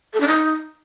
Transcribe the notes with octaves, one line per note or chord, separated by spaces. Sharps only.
A4
D4
D#4